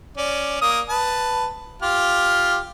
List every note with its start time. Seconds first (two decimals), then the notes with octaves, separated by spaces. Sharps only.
0.17 C#4 D5
0.61 A#3 D#6
0.89 B4 A5
1.82 F4 G4 F6